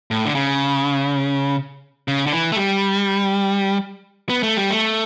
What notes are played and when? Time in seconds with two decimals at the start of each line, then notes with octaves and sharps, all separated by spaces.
0.11 A2
0.25 D3
0.35 C#3
2.08 C#3
2.26 D3
2.32 E3
2.52 A3
2.57 G3
4.29 B3
4.43 A3
4.57 G3
4.70 A3